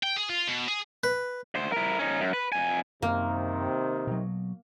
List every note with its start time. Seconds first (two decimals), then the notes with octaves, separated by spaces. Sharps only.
0.03 G5
0.16 G#4
0.29 F4
0.48 B2
0.68 G#4
1.04 B4
1.55 D2 C5
1.72 E4 A#4
1.99 C#4 D#4
2.21 F#2
2.33 B4
2.52 F2 G#5
3.02 F#2 C3 D#3 A#3
4.07 B2 F#3